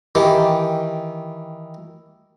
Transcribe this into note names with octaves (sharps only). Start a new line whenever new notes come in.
D#3 E3 G4